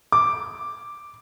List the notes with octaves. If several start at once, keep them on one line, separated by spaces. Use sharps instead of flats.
D6